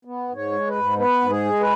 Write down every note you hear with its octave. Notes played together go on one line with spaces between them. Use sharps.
B3
G#2
C#5
G#3
B4
G#2
B3 B4
G#2
G#4
G#3
B4